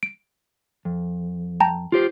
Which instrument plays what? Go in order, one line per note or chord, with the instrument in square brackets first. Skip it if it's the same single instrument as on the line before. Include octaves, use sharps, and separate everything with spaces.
[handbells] D7
[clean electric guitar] F2
[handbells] G5 A5 A#5
[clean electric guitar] F4 G4 C5